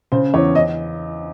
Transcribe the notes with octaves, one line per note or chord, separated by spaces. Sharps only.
C#3 C5
E2 C#5
D#5